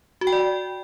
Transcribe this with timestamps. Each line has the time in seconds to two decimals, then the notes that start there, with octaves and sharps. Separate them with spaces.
0.21 F#4
0.27 G5
0.32 D5